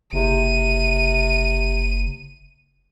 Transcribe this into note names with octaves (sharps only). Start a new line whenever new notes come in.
F#1 C3 D#7